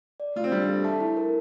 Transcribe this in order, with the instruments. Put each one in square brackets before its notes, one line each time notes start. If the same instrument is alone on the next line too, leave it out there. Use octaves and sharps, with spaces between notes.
[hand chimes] D5
[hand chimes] A3 [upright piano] F4
[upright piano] C4
[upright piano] G3 [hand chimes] D4
[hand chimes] A4
[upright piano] A3 [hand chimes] A5
[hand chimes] E4
A#4